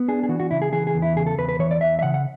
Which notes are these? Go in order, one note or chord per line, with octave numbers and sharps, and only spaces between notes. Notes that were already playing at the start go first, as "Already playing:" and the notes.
Already playing: B3
D4 G#4
G#4
E3 F#4
F#4
C#3 E4
G#4
E3 G#4
G#4
E2
E4
C#3 G#4
A4
E2 B4
B4
E3 C#5
D5
E2 E5
E5
C#3 F#5
F#5